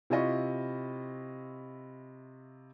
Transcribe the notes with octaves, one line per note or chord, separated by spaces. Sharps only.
C3 E4 F4 D#5 B5 C#6